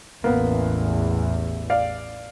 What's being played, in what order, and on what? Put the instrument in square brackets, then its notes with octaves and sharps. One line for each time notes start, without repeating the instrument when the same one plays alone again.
[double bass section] A1 E2 E3 [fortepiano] A#3 B3
[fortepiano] D5 F5